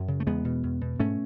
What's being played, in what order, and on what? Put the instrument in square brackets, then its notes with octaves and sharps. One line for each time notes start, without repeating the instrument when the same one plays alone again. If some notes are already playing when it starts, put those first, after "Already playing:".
Already playing: [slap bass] F#2 F#3
C#3
A3
E2 G#3 B3
B2
E2
B2
G#2 A3 C#4